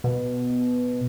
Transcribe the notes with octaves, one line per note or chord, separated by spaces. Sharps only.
B2